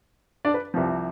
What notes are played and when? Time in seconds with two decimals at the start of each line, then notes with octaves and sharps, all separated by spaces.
0.45 D4 D5
0.54 B4
0.74 C2 C3 F3 C4